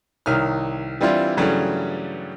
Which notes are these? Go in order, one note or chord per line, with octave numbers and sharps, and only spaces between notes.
C2 D#3 C#5 F6
E3 G3 C4 D4 E4 F4
G2 C#3 E3 F#3 G3 A3